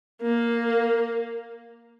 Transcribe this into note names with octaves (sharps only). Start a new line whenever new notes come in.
A#3